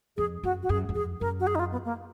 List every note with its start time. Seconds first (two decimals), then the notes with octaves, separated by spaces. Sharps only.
0.17 F2 G#4
0.43 F#2 F#4
0.63 F#4
0.69 F#2 G#4
0.89 F#2
0.95 F2 G#4
1.21 F#2 A#4
1.40 F#4
1.47 G#4
1.55 D#4
1.59 F4
1.72 B3
1.85 A#3